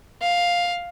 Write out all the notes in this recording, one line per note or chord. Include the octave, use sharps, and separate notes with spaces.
F5